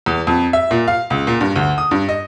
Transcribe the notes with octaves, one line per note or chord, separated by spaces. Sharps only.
E2
F2
E5
A#2
F5
C#2
A#2
G2
D2
D#6
G2
D#5